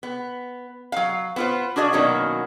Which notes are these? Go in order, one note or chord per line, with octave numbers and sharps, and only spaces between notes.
B3
F#3 F5
B3 F4 C5
D4 F#4 G#4 D5 D#5 F5
B2 D#3 F#3 A#3 C#4